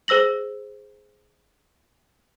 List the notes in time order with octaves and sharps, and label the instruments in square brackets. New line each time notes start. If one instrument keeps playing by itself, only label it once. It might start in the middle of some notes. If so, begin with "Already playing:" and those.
[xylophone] G#4 C5 E6 A#6 F#7